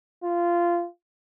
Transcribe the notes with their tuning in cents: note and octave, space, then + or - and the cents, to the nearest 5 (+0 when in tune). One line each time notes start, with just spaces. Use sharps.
F4 -15